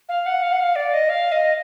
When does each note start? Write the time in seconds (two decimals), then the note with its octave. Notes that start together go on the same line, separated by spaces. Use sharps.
0.09 F5
0.26 F#5
0.42 F5
0.52 F#5
0.59 F5
0.76 D5
0.93 D#5
1.09 F5
1.32 D#5